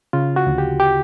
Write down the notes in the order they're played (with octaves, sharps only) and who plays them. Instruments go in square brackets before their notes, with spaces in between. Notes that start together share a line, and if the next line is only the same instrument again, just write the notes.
[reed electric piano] C#3 F4
F#4
D2
G4
G4